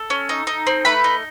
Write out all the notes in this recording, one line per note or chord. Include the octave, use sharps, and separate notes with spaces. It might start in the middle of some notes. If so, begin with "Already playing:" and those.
Already playing: A4
C#4
D#4
D#4
C4
A3 B4 B5
D#4